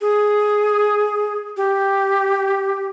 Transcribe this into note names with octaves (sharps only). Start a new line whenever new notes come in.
G#4
G4